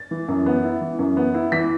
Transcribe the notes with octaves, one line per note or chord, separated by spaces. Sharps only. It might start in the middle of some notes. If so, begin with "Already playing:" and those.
Already playing: A6
E3
F#2
B3
E4
E3
F#2
B3
E4
E3 B6